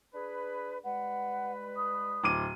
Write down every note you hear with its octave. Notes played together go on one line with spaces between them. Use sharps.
D4 G#4 B4
G3 G#3 B4 F#5
D#6
D1 D6 D#7